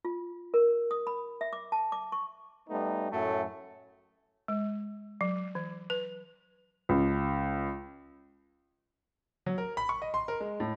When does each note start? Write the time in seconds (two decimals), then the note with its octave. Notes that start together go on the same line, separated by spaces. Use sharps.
0.05 F4
0.54 A#4
0.91 D#6
1.07 B5
1.41 E5
1.53 D6
1.72 A5
1.92 D6
2.12 C#6
2.69 G3 A3 B3 D#4
3.12 F#2 A2 F#3 A3
4.48 G#3
5.21 F#3
5.55 E3
5.90 B4
6.89 C#2
9.46 F#3
9.58 A#4
9.77 B5
9.89 C#6
10.02 D#5
10.14 C6
10.28 A#4
10.40 G#3
10.60 A2